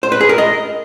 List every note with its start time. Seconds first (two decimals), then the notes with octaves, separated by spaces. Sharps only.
0.03 C5
0.12 B4
0.21 G#4
0.29 A#4
0.38 D#5